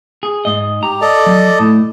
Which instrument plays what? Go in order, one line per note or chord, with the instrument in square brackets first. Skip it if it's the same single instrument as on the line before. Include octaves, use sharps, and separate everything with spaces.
[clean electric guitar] G#4
G#2 D#5
[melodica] G4 [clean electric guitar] A#5
[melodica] A4 D5 D#5
[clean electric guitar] F#3
A2